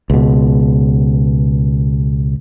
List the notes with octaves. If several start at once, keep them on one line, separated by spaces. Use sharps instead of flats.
C#2 B2